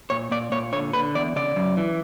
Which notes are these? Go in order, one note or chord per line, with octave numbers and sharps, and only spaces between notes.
A#2 C#5
A#2 D5
A#2 C#5
D3 C#5
D3 B4
E2 D5
C#3 D5
F#2
E3